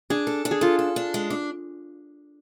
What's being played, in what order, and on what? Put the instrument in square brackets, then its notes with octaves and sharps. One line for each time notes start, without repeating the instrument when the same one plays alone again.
[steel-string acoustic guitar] D4 [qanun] G#4
[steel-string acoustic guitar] A4
D4
[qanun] G#4
[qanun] F4 [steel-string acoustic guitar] A4
[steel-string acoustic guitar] A4
D4
G#3
D4